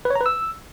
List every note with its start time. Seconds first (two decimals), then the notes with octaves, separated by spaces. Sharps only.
0.05 B4
0.10 C#5
0.15 A#5
0.21 B4
0.26 E6